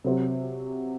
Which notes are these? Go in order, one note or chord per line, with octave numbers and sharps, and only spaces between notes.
C3 F#3 C4 F#4